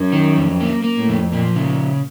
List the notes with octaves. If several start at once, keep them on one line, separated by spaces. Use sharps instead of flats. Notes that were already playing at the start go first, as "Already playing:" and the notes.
Already playing: F#2
D#3
F2
A#3
A#3
A2
F2
A#2 F3
C#3